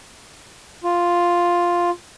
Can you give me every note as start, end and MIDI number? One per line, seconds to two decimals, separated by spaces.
0.84 1.90 65